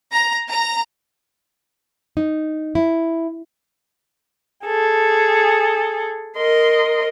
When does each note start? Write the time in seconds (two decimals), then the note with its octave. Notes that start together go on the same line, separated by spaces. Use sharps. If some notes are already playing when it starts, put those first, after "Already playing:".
0.12 A#5
0.50 A#5
2.17 D#4
2.75 E4
4.64 G#4 A4
6.37 A#4 D#5 C6